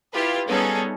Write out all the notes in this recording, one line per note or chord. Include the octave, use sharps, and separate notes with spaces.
E4 F4 G4 B4
G3 B3 C#4 D#4 G#4 A4